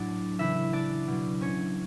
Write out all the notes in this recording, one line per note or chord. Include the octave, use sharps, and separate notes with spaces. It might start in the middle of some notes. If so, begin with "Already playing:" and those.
Already playing: A2 F#3 D4 A4 D5
C#3 E3 E4 E5
D4 D5
B2 F#3
C#4 C#5